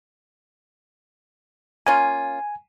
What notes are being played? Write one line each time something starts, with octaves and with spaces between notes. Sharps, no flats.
A#3 C#4 F4 G#5